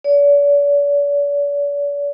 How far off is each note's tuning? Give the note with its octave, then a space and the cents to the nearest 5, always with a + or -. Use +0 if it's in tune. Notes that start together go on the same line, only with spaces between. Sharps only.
D5 -45